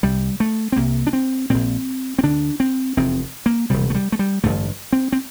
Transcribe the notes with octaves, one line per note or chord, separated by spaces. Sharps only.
C2 C3 G3
A3
C4
C2 C3 A#3
D4
C4
A#1 A#2 C4
C4
D2 D3 D4
C4
F1 E2 C3 C4
A#3
E1 D2 C3 G3
A3
G3
A3
G3
A1 G2 D3 A3
C4
C4